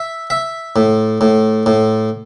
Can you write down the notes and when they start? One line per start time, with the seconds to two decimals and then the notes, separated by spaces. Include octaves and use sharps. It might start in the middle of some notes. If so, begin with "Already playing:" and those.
Already playing: E5
0.30 E5
0.76 A2
1.21 A2
1.66 A2